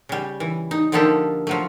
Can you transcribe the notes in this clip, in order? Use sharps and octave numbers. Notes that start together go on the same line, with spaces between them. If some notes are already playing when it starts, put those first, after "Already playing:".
C#3 G3
E3
D#4
D3 F3 A#3 D#4 G4 A4
F3 F#3 A3